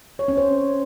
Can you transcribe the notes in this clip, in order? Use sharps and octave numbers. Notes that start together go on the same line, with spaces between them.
C#5
C#4
C5